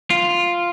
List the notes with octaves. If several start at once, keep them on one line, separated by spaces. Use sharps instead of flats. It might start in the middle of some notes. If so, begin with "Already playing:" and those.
F4